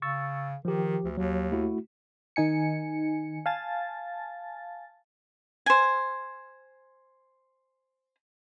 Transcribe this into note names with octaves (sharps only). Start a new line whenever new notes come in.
C#3 C#6 E6 A6
D#3 F3 G4
D2
D#2 F#3
A3 E4 F#4
D#3 D#4 G#5 C#7
F5 G#5 A5 A6
C5 G#5